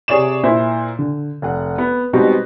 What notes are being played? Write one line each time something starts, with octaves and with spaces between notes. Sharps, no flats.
C3 G#4 C#5 D5 D6 E7
A#2 E4 C5
D3
F1 F#5
B3
B2 G3 G#3 C4 D#4 F#4